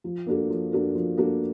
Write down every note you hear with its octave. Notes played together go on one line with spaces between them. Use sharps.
F3
A#3 D4 F#4 A4
F3
A#3 D4 F#4 A4
F3
A#3 D4 F#4 A4